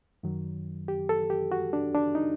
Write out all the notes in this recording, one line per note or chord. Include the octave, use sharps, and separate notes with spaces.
F#2 D#3 F#3
G4
A4
G4
F#4
D4
D4
D#4